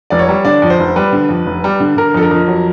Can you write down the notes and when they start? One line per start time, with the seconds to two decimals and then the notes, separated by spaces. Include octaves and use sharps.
0.10 F1 D5
0.19 C#5
0.29 G3
0.45 D3 D5
0.62 F2
0.70 C5
0.80 F1
0.96 G3 B4
1.13 D3
1.29 F2
1.47 F1
1.64 G3
1.80 D3
1.97 D3 A#4
2.14 F2 A4
2.23 A#4
2.31 F2
2.48 F#3